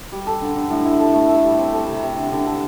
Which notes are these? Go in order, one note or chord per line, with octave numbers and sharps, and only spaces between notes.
G3
A4
D3
D3
A2
E4
A4
A3
A4
G3
C4
A4
C3
C3
D3
D3
A4